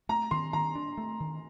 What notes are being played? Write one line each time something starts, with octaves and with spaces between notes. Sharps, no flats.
A3 A#5
D#3 C6
D#3 A#5
D4
A3
D#3